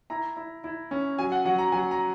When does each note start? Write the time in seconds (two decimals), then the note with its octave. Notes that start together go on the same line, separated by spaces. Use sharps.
0.10 E4 A#5
0.37 E4
0.64 E4
0.91 C#4
1.19 F#3 G#5
1.32 F#5
1.45 F#3 F#5
1.58 A#5
1.72 F#3 G#5
1.91 A#5